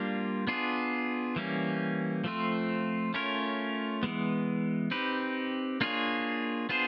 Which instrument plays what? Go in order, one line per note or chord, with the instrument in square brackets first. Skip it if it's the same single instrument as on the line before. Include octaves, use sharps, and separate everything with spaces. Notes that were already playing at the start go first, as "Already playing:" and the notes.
Already playing: [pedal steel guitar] G3 A#3 D4 F4
B3 D4 F4 G#4
E3 G3 A#3 C#4
F3 A3 C4 F4
A3 C#4 F4 A#4 C#5
E3 G#3 B3
C4 D#4 G4 B4
A#3 D4 F4 G#4 C#5
B3 D4 F4 G#4 C5